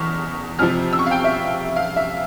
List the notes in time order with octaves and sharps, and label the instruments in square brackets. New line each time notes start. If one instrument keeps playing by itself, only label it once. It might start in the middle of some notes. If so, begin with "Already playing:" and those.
Already playing: [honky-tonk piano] E2 C#6 F6
F2 C3 F3 F6
E6
C#6
F5
G5
E5
F5
E5